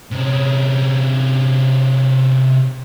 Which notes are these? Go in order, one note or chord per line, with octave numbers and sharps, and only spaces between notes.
C3 C#4